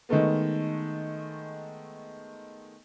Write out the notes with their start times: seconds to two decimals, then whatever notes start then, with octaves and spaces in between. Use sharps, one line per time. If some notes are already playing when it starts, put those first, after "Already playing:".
0.09 D#3 G#3 A3 B3